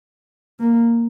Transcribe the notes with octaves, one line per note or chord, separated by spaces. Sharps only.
A#3